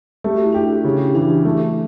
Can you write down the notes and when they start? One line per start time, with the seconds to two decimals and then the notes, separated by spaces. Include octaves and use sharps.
0.24 A3 G4
0.34 F#4
0.43 E4
0.52 D4 F#4 G4
0.84 C#3
1.15 E3 D4 F#4
1.45 A3 E4